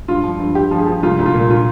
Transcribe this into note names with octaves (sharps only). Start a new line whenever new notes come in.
G2 F4
F3
G2
G2 G4
F3
G#4
F3
C2 F4
C2
F4
A#2
F4